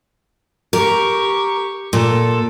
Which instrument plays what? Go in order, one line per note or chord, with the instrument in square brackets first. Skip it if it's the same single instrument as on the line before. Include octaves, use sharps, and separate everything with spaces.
[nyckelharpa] G4 C#6 [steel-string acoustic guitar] A#4
[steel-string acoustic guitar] A#2 [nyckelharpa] A4